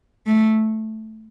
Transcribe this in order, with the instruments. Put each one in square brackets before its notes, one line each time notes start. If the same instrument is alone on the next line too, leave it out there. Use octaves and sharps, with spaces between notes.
[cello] A3